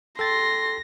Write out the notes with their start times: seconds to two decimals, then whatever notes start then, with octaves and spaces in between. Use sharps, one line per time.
0.19 A4 G5 C6 A6 A#6